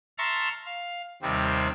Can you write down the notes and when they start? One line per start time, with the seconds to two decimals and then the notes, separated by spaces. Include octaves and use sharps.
0.18 E5 A5 A#5 C6 C#6 F6
0.66 F5
1.22 D#2 C3 G3 C4